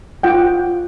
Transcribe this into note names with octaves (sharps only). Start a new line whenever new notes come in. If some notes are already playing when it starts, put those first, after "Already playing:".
F4 F#5 G5